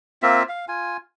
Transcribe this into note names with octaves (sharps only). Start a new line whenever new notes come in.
A#3 C4 F4 E5
F5
F4 G#5